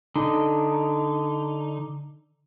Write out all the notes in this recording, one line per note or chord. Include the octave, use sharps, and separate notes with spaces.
D3 D#4